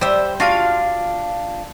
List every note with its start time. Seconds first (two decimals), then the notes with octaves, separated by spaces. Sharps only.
0.01 G3 C5 E5
0.40 D4 F4 F#4 F5